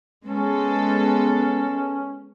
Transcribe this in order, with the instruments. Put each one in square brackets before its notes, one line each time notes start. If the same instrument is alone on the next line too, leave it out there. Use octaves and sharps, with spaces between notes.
[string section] G#3 B3 A4 [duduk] C#4